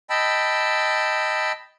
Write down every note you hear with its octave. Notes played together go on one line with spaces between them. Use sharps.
D#5 G5 A5 B5 E6